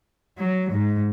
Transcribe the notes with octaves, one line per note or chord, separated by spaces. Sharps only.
F#3
G#2